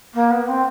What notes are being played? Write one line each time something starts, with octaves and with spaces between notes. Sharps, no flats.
A#3
B3
C4